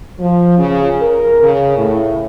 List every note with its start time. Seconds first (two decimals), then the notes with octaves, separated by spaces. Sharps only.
0.20 F3
0.58 C#3
1.01 A#4
1.42 C#3
1.77 A2